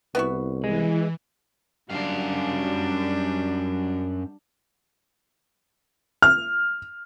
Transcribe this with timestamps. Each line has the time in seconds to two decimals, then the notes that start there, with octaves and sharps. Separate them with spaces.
0.15 C2 B3 E4 F#4
0.64 E3 G#3
1.90 F#2 G3 D4 F5
6.22 F6